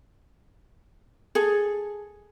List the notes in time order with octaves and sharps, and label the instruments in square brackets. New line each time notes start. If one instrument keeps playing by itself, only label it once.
[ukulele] G#4 A4